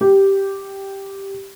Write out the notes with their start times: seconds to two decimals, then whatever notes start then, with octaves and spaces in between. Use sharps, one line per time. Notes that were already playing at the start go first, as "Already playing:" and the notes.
0.01 G4